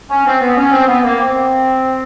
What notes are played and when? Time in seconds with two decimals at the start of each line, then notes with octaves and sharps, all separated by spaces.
0.09 C#4
0.26 C4
0.40 B3
0.57 C#4
0.72 C4
0.87 B3
1.03 A#3
1.19 C4